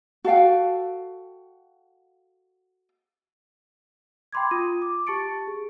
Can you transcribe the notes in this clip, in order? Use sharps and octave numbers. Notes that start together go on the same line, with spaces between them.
F#4 A4 F5 G5
G5 B5 C6 D6 G#6
F4 D#6 D#7
D6
G4 A5 C#6 A6 C#7 D7
G#4